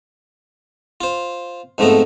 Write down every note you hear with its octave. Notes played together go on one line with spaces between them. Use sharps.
F4 C5
F2 G#2 F3 A3 B3 A#5